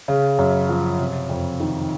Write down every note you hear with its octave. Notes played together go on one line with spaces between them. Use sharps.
C#3
F#2
F3
C3
F2
D#3